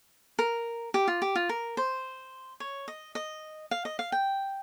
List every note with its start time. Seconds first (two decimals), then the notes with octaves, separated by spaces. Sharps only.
0.39 A#4
0.94 G4
1.08 F4
1.22 G4
1.36 F4
1.49 A#4
1.77 C5
2.60 C#5
2.88 D#5
3.15 D#5
3.71 F5
3.85 D#5
3.99 F5
4.12 G5